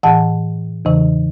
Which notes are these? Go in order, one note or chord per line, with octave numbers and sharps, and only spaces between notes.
A2 E3 F#5 A5
E2 C#3 E3